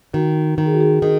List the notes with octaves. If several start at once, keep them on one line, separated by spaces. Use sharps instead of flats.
D#3 F#4
D#3
G#4
F#4
G#4
D#3 G#4